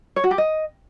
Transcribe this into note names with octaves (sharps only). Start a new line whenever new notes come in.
C#5
F#4
G4
D#5